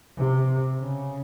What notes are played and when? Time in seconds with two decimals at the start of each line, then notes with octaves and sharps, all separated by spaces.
0.17 C3
0.79 C#3